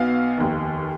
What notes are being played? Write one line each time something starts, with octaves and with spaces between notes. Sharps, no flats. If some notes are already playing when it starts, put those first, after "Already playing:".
Already playing: B1 B2 B3 F5
F1 D#2 D#3